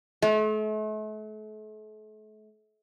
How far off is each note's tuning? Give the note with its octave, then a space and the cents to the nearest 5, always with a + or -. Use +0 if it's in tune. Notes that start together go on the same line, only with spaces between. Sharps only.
A3 -40